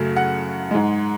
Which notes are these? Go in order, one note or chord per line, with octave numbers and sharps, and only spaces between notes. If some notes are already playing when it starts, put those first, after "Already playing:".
Already playing: F#2 C#3 F#3 A3
F#5
G#2 G#3